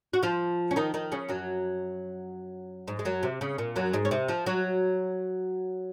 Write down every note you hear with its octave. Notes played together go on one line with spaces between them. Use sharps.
F#4
F3 F4
C#4
D#3 D#4
D#3 D#4
C#3 C#4
F#2 F#3
G#2 G#3
G#3
F#2 F#3
C3
C#3
A#2
F#2 F#3
G#2 G#3
C#4
C3 C4
F3 F4
F#3 F#4